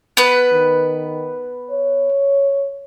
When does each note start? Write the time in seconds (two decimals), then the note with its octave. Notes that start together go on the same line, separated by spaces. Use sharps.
0.17 B3 B4
0.52 D#3
1.71 C#5